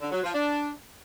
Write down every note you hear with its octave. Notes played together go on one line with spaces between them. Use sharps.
D3
F#3
F3
D4